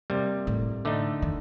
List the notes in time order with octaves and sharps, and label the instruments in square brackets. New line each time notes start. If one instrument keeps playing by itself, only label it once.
[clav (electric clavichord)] C3 G3 A#3
[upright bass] A2
[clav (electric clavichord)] D3 A3 D#4
[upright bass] D#3